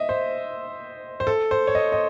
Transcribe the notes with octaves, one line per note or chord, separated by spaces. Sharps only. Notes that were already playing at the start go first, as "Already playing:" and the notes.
Already playing: D#5 E5
C5
C5
A4
C5
C#5
D#5
D#5